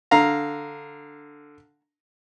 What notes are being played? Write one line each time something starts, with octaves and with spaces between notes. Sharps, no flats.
D3 F5 A#5